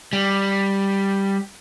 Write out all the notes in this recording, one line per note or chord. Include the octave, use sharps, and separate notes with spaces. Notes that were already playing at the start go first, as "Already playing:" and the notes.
G3